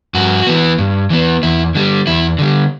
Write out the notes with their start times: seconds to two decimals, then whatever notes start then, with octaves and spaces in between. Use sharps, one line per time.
0.14 G2 F#4
0.47 E3 B3
0.78 G2
1.10 E3 B3
1.43 E2 E4
1.75 D3 G3
2.07 E2 E4
2.39 D3 G3